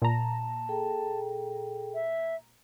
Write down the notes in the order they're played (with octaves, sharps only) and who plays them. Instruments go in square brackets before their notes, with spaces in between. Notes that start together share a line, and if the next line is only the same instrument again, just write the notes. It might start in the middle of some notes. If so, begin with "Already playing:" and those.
[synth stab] A#2 A#5 [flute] A5
[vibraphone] G#4 A4 G5
[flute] E5